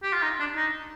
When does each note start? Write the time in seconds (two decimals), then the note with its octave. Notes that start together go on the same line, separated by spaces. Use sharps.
0.03 G4
0.12 F4
0.23 D#4
0.39 D4
0.56 D#4